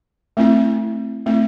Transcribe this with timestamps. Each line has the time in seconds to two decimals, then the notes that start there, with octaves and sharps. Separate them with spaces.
0.37 A3 C4 E4
1.26 A3 C4 E4